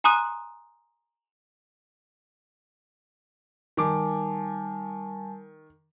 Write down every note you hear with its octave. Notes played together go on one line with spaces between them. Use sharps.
G#5 A#5 C6 D#6 F#6 D#7
D#3 G3 G#5 A5 D6